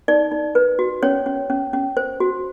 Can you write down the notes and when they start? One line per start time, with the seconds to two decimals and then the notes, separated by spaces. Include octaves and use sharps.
0.08 D#4 D5
0.31 D#4
0.55 B4
0.79 F#4
1.03 C#4 C#5
1.26 C#4
1.50 C#4
1.73 C#4
1.97 C5
2.20 F#4